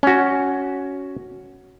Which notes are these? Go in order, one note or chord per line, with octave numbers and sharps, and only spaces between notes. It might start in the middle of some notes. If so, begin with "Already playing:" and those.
C#4 F#4